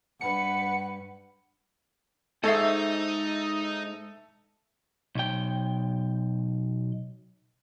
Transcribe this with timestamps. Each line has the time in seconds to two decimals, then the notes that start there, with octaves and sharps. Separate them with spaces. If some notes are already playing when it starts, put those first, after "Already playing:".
0.21 G2 B4 F#5 C#7
2.44 G#2 D#4 A4 D#5 E5 C#6 E6 C7
5.15 B1 G5